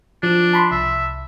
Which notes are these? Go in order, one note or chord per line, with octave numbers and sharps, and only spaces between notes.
F3 D4
A5 B5 C6
C2 E5